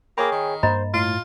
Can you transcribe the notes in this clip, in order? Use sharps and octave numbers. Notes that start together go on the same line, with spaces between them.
A#3 G#4 C#5 G5 B5
D#3
G2 A#3 C5 D#5 A#5 B5
A2 F4 A6